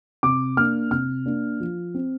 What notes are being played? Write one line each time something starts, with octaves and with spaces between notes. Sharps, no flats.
C3 D6
A#3 D4 F6
C3 F6
A#3 D4
F3
C4